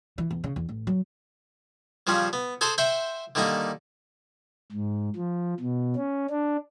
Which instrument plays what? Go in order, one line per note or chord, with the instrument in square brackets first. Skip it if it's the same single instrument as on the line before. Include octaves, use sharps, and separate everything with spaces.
[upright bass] E3
E2
C#3
E2
A1
F#3
[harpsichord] C#3 F3 G3 C4 C#4
B3
G#4 A4 C5 G#5 C6
C5 E5 F#5 G5 C6
D3 D#3 G3 A#3 D#4
[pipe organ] G#2
F3
B2
C#4
D4